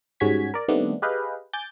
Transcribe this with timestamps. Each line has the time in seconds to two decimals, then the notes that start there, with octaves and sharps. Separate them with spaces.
0.20 G#2 G3 C#4 F#4 G#6 B6
0.54 A#4 D5
0.69 D#3 G3 A3 B3 C4 D4
1.02 G4 G#4 B4 D#5 F5 G5
1.53 G#5 D6 G6 A6